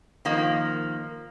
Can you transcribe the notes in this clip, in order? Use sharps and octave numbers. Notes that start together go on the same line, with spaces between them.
D#3 F3 A#3